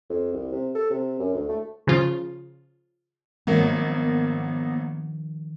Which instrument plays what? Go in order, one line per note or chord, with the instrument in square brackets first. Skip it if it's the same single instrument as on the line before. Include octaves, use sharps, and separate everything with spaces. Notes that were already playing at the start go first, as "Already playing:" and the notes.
[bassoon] F2
C2
C3
A4
C3
F#2
D2
A3
[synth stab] C#3 F3 F4
[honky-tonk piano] G#1 F#3 A#3 [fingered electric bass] D#3 F3 D4 [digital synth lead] B3